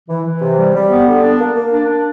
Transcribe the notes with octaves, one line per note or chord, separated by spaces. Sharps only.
E3
E3
C3
G3
G3
B3
D3
D4
A#3
A#3
D4
D4